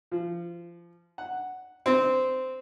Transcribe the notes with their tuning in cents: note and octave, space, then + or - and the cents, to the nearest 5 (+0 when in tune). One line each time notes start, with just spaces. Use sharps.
F3 -25
F#5 +0
C4 -10